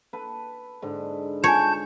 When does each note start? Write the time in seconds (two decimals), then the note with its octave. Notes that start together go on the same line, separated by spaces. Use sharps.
0.13 A4 B4
0.82 G#2 D3
1.44 F4 C#5 G#5 A5 G6